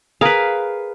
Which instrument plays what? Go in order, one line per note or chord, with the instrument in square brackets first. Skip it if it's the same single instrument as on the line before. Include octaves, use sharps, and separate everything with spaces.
[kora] G#4 A#4 [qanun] B4 F5